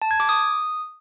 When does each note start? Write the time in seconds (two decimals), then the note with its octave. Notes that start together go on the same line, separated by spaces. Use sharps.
0.02 A5
0.11 G#6
0.20 D6
0.29 D#6